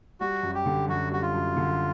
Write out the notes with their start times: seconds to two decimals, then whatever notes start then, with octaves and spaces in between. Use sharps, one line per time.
0.21 G3 F#4
0.43 F#2
0.55 G4
0.66 D3
0.88 F#2 F#4
1.11 G3 F#4
1.22 F4
1.34 F#2
1.56 D3